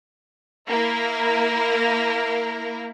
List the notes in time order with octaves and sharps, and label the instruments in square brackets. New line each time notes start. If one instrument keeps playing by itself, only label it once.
[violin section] A#3 E4 A#4